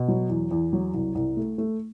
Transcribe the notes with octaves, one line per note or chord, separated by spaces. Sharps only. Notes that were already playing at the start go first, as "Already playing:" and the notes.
Already playing: B2
F#3
E2
E2
F#3
C2
C2
A3
A3